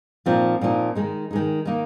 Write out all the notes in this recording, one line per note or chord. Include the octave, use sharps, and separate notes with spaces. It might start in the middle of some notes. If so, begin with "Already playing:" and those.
A#2 F3 C4 D#4
A#2 F3 C4 D#4
D#3 G#3 D#4
D#3 G#3 D#4
D#3 A#3 D#4